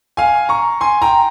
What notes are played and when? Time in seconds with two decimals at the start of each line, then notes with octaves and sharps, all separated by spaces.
0.17 F5 G#5
0.49 A#5 C#6
0.81 G#5 C6
1.02 G5 A#5